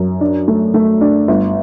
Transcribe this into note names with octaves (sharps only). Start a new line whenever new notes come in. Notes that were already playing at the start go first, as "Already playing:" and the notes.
Already playing: F#2
D4
A3
A3
D4
G1